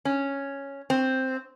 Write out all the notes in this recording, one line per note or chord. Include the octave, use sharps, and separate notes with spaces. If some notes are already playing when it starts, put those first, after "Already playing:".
C#4
C4